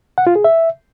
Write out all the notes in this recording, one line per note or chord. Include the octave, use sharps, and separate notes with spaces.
F#5
F4
G#4
E5